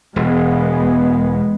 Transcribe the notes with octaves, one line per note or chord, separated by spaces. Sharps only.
E1 G#3 B3